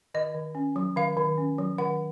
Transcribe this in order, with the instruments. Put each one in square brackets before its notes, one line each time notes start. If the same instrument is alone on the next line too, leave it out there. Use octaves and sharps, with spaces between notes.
[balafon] D#3 D#5
D#3
C#4
F#3
D#3 F5
D#3
C#4
F#3
D#3 F#5